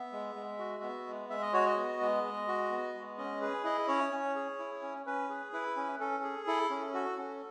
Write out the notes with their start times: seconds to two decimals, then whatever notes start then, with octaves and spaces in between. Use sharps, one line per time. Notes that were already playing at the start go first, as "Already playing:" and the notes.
Already playing: B3 E5
0.12 G#3
0.35 G#3
0.59 F#4
0.83 B3
1.06 G#3
1.30 G#3 E5
1.42 D#5
1.53 F#4 C#5
1.66 D#5
1.77 B3
2.01 G#3
2.24 G#3
2.48 F#4
2.70 B3
2.94 G#3
3.18 C#4 D#5
3.41 G#4 B4
3.64 E4 D#5
3.88 C#4 C#5
4.12 C#4
4.35 G#4
4.59 E4
4.82 C#4
5.06 C#4 B4
5.29 G#4
5.53 E4 B4
5.76 C#4
6.00 C#4 A4
6.23 G#4
6.47 E4 A4
6.70 C#4
6.94 F#4 A4
7.18 C#4